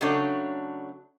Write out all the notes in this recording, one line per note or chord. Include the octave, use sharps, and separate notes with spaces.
C#3 F#3 A3 D4 C#5